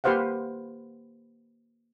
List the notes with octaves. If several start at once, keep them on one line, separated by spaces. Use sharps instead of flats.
A#3 G4 B4 C5 F5 F#5